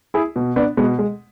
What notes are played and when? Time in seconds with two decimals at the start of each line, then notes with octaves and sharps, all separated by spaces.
0.14 E4 G#4
0.36 B2
0.56 B3 D4
0.77 B2 G#3 B3
0.99 G#3